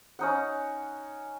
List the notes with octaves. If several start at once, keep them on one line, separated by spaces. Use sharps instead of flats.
C#4 D#4 F#5